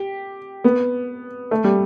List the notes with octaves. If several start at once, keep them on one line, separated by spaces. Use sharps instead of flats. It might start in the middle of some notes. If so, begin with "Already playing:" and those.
Already playing: G4
B3
A3
G3